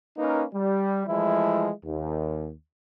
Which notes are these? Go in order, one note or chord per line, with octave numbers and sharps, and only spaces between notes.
A#3 C#4 D#4 A#4 B4
G3
E3 F3 G#3 A3 E4
D#2